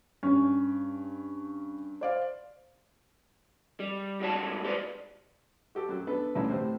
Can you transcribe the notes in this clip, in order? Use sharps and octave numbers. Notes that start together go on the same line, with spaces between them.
G2 C#4
C5 D5 F5
G3
G#2 G3 F#4 C#5 A5
G4 B4 C5 D5
F#4 G4 A4
F#2 F#3
B3 D4 A4 B4
A1 D2 G2 C#4 E4 E6
A2 C3 C5